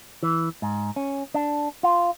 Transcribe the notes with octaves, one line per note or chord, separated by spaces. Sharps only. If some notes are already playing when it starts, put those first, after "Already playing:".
E3
G#2
C#4
D4
F4